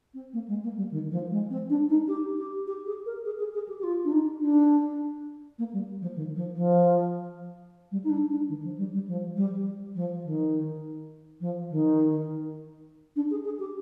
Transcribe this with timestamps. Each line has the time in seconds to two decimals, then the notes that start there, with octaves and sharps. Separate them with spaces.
0.14 C4
0.33 A#3
0.48 G#3
0.63 A#3
0.77 G3
0.91 D#3
1.11 F3
1.31 G#3
1.50 C4
1.69 D4
1.89 D#4
2.07 G4
2.37 G4
2.67 G4
2.86 G#4
3.06 A#4
3.25 G#4
3.39 G#4
3.54 G#4
3.68 G4
3.78 G4
3.83 F4
4.04 D4
4.12 D#4
4.41 D4
5.58 A#3
5.73 G3
6.01 F3
6.16 D#3
6.35 F3
6.55 F3
7.91 G3
8.03 D#4
8.10 D4
8.29 D4
8.49 D#3
8.63 F3
8.78 G3
8.93 G3
9.07 F3
9.36 G3
9.95 F3
10.24 D#3
11.40 F3
11.70 D#3
13.16 D4
13.30 G#4
13.44 G#4
13.59 G4